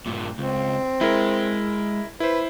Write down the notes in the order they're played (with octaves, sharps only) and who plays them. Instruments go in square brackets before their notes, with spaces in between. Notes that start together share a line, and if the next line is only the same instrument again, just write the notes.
[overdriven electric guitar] G2 A#2
[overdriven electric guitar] C#2 [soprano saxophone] C4
[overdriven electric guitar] G#3 [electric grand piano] E4 A#4
[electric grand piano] E4 C5 [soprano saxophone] B4